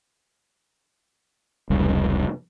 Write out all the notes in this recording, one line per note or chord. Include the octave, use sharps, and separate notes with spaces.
F1 C#2 G3